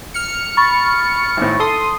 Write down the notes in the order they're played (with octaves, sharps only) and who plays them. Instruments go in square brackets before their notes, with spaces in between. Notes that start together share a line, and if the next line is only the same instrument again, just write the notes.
[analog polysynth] F6 C#7
[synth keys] B5 C#6 A6
[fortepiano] G#1 A2
[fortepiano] A4 [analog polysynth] C6 D#6